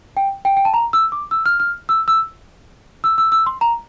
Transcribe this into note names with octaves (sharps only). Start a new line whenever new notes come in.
G5
G5
G5
A5
A#5
E6
D6
E6
F6
F6
E6
E6
E6
E6
E6
C6
A#5